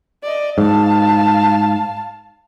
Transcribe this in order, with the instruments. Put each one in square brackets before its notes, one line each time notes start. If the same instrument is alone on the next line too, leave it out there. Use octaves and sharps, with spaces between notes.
[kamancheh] D5 D#5
[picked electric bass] G#2 [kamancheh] F5 A5